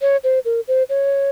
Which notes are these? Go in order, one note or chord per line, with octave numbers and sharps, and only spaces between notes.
C#5
C5
A#4
C5
C#5